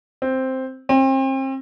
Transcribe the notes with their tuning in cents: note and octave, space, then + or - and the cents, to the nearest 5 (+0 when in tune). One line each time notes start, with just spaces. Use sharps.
C4 +0
C4 +35